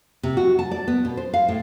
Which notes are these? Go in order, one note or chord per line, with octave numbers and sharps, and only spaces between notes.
C3
F#4
A5
D5
B3
B2
C5
F5
A2